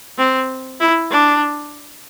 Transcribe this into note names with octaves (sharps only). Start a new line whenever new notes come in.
C4
E4
D4